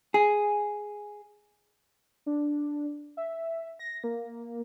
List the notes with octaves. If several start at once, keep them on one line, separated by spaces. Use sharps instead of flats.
G#4
D4
E5
A#6
A#3